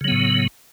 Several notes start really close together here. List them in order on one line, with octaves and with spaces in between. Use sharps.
C#3 F#3 B3 A2